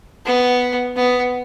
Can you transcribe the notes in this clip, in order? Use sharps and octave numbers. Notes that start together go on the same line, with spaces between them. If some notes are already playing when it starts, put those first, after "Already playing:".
B3
B3